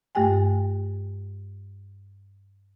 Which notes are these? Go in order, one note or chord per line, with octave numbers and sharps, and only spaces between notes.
G2 A3 G4 G5 G#5